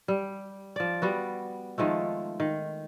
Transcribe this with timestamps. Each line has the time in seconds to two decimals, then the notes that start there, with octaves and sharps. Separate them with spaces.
0.08 G3
0.76 F3 D5
1.02 G3 B3 F#4
1.78 D#3 F3 G#3 A3
2.40 D#3